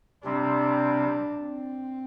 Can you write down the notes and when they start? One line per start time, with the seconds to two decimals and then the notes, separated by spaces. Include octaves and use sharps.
0.24 C3 G3 C4 D4
1.41 C4